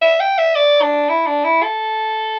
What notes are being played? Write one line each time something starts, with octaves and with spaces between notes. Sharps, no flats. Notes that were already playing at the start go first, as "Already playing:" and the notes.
E5
G5
E5
D5
D4
E4
D4
E4
A4